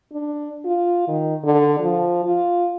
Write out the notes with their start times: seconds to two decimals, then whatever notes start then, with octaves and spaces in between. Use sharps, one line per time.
0.12 D4
0.65 F4
1.08 D#3
1.44 D3
1.80 F3
2.25 F4